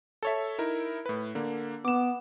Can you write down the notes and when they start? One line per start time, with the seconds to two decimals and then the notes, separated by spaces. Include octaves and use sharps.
0.23 A4 C#5 E5
0.58 D#4 E4 A#4
1.06 A2 B4
1.35 D3 A#3
1.85 B3 D6 E7